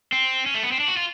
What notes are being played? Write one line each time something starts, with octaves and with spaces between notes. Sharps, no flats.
C4
C#4
A3
B3
C4
D4
F#4
F4